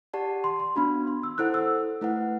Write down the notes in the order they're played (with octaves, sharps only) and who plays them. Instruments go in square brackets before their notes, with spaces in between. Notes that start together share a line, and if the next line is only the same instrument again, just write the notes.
[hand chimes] G4 D5 F#5 A5
[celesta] C6
C6
[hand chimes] B3 D4 F#4 [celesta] B5
[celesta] C6
E6
[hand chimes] E4 A4 C5 F#5 [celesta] F#6
[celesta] E6
[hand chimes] A3 E4 B4 F#5